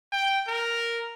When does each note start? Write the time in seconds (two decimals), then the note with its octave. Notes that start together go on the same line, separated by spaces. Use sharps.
0.12 G5
0.48 A#4